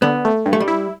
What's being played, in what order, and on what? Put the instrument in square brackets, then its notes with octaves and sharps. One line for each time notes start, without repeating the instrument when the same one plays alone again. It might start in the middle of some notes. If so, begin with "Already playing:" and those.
[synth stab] D3 [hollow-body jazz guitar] B3
[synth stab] A3
G2
[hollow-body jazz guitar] A3
G3
[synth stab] E4